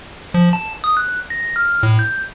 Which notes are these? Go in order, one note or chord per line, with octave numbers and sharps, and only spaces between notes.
F3
A5
D#6
F#6
A#6
F6
A2
G6